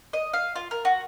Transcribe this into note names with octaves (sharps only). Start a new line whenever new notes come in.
D#5
F5
F4
A#4
F#4